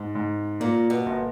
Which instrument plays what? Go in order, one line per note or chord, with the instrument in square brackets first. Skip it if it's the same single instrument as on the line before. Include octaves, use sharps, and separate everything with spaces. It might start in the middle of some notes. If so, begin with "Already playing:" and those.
Already playing: [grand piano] G#2
G#2
[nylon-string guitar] A#2 [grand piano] A#3
[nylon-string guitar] B2
[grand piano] G1